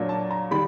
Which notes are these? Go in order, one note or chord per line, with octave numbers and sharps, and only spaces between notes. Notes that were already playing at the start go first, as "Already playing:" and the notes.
Already playing: A#2 F#3 A#3 D4
A5
A#5
D#3 G3 B5